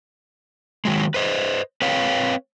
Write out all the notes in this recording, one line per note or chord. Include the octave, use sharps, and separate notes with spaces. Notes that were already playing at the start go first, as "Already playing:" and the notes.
D#3 F#3 G#3
B4 C5 D#5
C4 B4 C#5 F5 G5